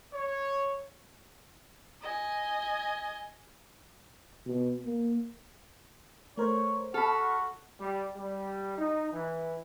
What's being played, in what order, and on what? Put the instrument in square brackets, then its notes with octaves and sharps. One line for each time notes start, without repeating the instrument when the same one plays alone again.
[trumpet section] C#5
[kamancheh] D#5 G#5
[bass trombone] B2
A#3
[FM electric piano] A3 A#4 C5 [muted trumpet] C#5
[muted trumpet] F#4 [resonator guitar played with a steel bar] A4 [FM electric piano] B5 F6
[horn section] G3
G3
D#4
E3